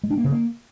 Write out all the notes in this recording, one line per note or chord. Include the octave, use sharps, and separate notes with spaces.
G#3
D4
A#3
C#3
A#3